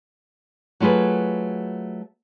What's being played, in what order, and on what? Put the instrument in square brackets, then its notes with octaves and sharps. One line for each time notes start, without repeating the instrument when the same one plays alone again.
[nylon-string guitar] F#3 A3 F4 G#4 B4